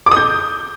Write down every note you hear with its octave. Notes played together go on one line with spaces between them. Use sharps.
D6
D#6
G6